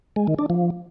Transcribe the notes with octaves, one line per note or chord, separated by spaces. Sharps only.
G#3
D#3
D4
F3